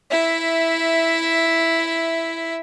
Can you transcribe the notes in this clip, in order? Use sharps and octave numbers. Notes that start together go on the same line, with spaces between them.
E4 E5